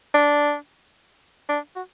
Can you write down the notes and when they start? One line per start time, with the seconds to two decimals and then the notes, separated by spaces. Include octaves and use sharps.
0.14 D4
1.49 D4
1.76 F#4